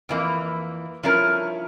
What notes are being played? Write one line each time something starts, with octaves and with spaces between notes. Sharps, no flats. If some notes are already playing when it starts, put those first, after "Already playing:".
F2 E3 A#3
G2 F3 C#4 E4 A#4